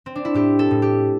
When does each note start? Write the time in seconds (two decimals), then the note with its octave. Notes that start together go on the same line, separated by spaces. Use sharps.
0.06 C4
0.15 D4
0.25 E4
0.34 A2 G4
0.59 A4
0.71 A2
0.82 G4